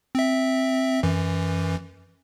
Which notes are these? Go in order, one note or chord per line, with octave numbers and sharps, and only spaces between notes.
C4 E5
F#2 E3